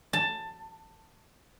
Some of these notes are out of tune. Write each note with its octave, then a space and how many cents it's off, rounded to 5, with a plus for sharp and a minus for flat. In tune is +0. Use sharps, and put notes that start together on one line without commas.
A5 +15